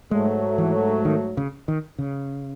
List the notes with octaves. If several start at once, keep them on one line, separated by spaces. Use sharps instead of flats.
G#2 F#3 G#3 A3
E3
D#3
C#3
D#3
C#3